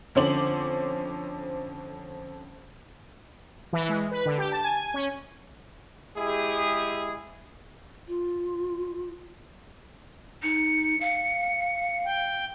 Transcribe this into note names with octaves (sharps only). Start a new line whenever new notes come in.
F2 D3 C#4 C5 D6 F#7
E3
G#3
B4
D3
G4
A5
G#5
G#5
C#4
G#3 E4 G4 G#4
F4
D#4 C#7
F5
G5